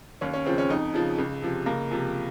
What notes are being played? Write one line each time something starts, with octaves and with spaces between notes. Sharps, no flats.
D#2 C#4
C#4
C#3 F3 C4
C#4
F2 D#4
C#3 F3
C#2
C3 F3
C#2 A#3
C3 F3